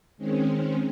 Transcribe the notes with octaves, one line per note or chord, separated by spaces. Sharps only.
D#3 G#3 C4 C#4